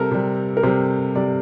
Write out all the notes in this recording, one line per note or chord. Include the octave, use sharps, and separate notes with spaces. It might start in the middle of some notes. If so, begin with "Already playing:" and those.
Already playing: C3 G3 A4 A#4
C3 G3
A#4
C3 G3 C5
C3 G3 D5